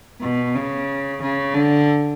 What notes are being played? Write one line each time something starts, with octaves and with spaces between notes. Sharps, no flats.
B2
C#3
C#3
D3